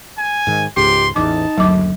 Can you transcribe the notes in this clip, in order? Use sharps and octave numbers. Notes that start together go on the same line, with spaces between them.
G#5
G#2 D#3
C#2 G#2 G4 C6
A1 E2 D#4 A5 D6
F#1 D2 F#3 D6